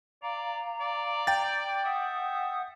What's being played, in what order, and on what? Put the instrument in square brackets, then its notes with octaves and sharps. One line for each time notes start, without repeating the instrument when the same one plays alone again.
[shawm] D5 [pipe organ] F5 A#5
[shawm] D5
[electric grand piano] G5 A6
[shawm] E5 [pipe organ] F#5 D#6